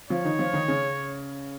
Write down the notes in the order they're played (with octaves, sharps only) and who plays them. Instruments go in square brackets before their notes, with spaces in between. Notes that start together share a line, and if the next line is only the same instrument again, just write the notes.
[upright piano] F3 F4 [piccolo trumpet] C#5
[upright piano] D#3 D#4
F3 F4
D#3 D#4
C#3 C#4